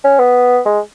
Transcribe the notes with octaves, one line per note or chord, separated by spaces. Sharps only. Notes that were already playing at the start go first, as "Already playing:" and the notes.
C#4
B3
G#3